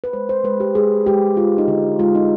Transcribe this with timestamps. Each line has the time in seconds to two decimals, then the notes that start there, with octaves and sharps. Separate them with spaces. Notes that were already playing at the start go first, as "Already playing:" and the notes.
0.04 B4
0.13 G#3 C5
0.29 C5
0.44 G#3 B4
0.60 G4
0.75 G#3 G#4
1.06 G#3 G4
1.37 G#3 F4
1.58 D#4
1.68 D3
1.99 G#3 F4
2.15 D#4